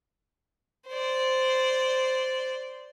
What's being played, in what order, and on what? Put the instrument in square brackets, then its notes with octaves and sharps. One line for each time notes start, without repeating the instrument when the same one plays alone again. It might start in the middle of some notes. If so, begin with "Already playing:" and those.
[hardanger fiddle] C5 D5